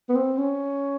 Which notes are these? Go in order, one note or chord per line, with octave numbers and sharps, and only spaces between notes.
B3
C4
C#4